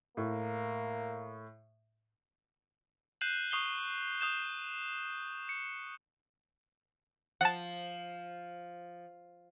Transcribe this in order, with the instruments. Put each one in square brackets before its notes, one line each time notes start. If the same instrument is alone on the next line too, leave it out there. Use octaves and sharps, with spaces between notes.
[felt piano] A2 [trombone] A#3
[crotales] F#6 G6 C7 D#7 E7 F#7
C#6 D#6 C7 F#7 G7
D#6 G6 E7
C#7
[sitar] F3 [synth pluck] F#5 A5